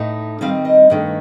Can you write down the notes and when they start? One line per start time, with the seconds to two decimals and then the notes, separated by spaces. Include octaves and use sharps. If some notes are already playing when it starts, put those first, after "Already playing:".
Already playing: A2 A3 D#4
0.41 D#3 G3 C4 D#4 F5
0.65 D#5
0.90 G2 D#3 A3